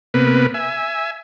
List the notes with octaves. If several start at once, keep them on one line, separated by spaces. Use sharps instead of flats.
C3 A#3 B3 B4
E5 G#5